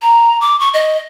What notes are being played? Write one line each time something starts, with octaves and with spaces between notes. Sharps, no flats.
A#5
D6
C#6
D#5